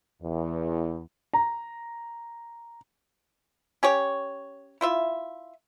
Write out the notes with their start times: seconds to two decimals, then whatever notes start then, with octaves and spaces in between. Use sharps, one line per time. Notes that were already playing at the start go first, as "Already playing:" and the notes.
0.22 E2
1.34 A#5
3.83 C#4 G4 C#5
4.81 E4 F4 E5